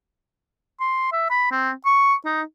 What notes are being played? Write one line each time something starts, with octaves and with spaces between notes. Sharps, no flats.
C6
E5
B5
C4
C#6
D#4